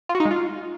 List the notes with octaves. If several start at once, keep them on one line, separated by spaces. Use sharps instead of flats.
F4
F#4
D#4
G#3
F4